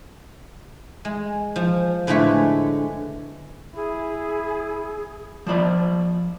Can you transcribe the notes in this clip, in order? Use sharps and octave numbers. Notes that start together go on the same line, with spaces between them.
G#3
F3
A2 D3 G#3 A3 B4 C#5
E4 G#4
F3 C5 D5 B5